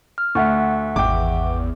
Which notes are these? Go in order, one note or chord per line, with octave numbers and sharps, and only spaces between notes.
F6
D2 E5 F#5 C#6
G#1 E2 G5 D6